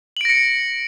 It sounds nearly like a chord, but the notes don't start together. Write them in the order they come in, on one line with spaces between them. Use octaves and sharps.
F#7 D7 A#6 C#7